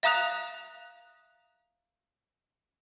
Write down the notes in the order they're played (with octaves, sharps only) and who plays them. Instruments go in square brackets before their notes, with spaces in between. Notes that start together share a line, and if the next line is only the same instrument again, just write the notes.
[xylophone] E5 F5 A#5 D#6 F#6 F7